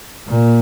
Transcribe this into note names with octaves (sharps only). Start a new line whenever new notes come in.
A#2